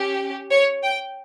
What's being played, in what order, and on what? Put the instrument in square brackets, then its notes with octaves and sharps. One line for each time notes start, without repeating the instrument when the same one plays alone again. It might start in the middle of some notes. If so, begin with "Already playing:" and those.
Already playing: [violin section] C#4 G4
C#5
G5